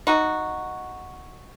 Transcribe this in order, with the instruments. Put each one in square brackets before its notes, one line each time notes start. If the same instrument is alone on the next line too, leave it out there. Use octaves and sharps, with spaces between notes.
[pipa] D#4 F#4